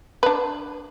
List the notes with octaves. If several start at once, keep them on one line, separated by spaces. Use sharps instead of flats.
D4 B4